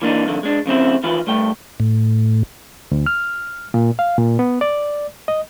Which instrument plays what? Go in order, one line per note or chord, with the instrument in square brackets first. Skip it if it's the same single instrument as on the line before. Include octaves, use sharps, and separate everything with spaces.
[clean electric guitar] E3 A#3 D4 D#4
C2 F2 D3 D#3
G#3 D4
F2 C#3 C4 E4
D#3 E3 F4 B4
G2 A3 G5
[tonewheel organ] A2
[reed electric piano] D2
F6
A#2
F5
A#2
B3
D5
D#5